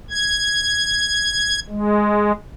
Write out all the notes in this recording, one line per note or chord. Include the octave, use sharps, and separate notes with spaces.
G#6
G#3